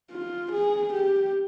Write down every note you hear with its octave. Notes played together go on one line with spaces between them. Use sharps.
F4
G#4
G4